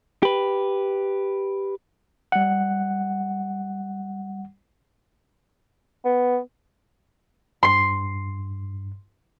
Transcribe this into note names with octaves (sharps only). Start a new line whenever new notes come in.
G4 B4
G3 F#5
B3
G2 C6 C7